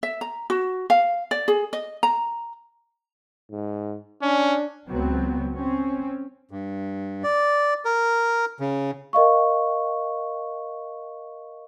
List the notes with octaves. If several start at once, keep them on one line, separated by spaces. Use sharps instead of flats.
E5
A#5
F#4
F5
D5
G#4
D#5
A#5
G#2
C#4 D4
C#2 F#3 B3 C4
C4 C#4
G2
D5
A#4
C#3
A#4 D#5 F5 C#6